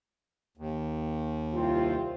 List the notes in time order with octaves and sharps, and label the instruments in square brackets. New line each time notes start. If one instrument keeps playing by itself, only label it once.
[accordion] D#2
[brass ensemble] C2 C4 F4